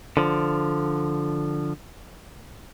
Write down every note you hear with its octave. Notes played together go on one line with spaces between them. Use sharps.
D3 F3